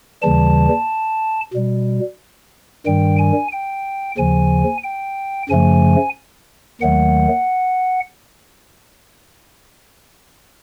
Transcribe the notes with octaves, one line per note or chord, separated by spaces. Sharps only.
D#2 C#3 E3 G3 A5
B2 G3
G2 D#3 G3 G5
G#5
G5
D#2 C#3 F3 G#5
G5
F#2 C#3 F3 A3 G#5
D#2 D#3 F#3 A3 F#5